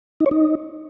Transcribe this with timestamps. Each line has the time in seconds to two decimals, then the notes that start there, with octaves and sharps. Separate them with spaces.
0.20 D#4
0.26 C#5
0.31 D#4